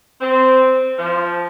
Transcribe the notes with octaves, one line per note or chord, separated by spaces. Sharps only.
C4
F3